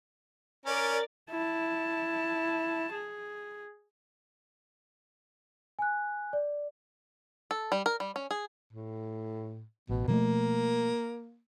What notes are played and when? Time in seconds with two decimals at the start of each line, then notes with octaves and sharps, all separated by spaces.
0.66 C#4 A#4 D5 A6
1.31 E4 A5
2.93 G#4
5.79 G#5 F#6
6.33 D5
7.51 A4
7.72 G3
7.86 A#4
8.00 G3
8.16 C#4
8.31 G#4
8.73 A2
9.89 A1 B2
10.08 B2 F3 A3 A#3